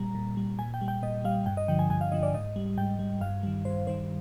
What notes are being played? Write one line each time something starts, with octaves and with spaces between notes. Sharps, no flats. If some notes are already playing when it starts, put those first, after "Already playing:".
Already playing: A#2 G3 A#5
A#2
G3
A#2 G#5
G5
G3
G5
A#2 D#5
G3 F5
G2 G5
D#5
D3 F3 G5
G#5
G2 G#5
F5
D3 F3 D#5
D5
G#2 D#5
G3
G#2 G5
G3
G2 F5
D#3 G3
G2 C5
D#3 G3 C5